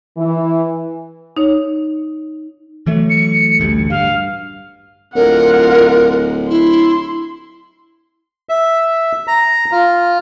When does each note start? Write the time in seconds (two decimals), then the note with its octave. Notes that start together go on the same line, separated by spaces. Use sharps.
0.18 E3
1.37 D#4 C#5
2.86 E3 F#3 A3
3.10 C#7
3.60 A1 D2 G3
3.90 G2 F5
5.15 D1 F4 A#4 F#5
6.50 E4 C6
8.49 E5
9.28 A#5
9.72 F4